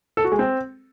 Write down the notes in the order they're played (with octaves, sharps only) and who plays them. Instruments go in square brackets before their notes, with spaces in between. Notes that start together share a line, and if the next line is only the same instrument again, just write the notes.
[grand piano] A4
F#4
G#3
C4